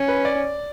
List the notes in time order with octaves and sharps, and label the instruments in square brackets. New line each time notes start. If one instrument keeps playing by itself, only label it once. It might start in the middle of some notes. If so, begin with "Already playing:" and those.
Already playing: [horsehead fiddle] C#4
[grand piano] B4
D5